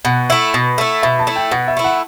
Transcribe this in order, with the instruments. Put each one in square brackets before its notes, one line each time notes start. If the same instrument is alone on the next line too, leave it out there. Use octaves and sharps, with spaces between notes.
[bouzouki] B2 [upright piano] F#5
[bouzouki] A3 E4
B2
A3 E4
[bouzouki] B2 [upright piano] E5
[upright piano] A5
[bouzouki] A3 E4
[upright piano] G5
[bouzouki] B2 [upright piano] F#5
[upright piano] E5
[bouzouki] A3 E4
[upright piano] F#5